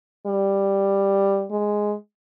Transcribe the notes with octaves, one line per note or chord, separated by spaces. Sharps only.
G3
G#3